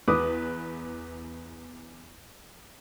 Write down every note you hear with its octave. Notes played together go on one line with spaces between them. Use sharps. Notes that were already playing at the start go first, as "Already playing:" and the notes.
E2 B4 D6 D#6